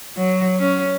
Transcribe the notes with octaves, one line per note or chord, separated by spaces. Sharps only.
F#3
C#4